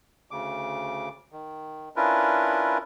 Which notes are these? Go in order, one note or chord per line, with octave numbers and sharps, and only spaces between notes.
D2 C#3 D6
D#3
C#4 D4 E4 F4 A#4 B4